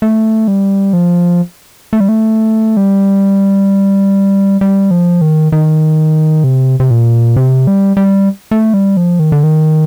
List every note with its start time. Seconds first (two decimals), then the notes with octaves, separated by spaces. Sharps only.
0.02 A3
0.48 G3
0.93 F3
1.93 A3
2.00 G3
2.09 A3
2.77 G3
4.61 G3
4.91 F3
5.21 D#3
5.52 D#3
6.44 C3
6.80 C3
6.91 A#2
7.36 C3
7.67 G3
7.97 G3
8.51 A3
8.74 G3
8.97 F3
9.19 D#3
9.32 D3
9.44 D#3